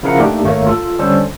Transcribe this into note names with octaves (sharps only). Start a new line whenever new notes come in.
C#3 F3 E4 A#4 F5 F#5
A3 A#3 D4 D#4 G4
G#1 A3 A#3 C#5
F4 A4
D3 G3 C#4 A4 C5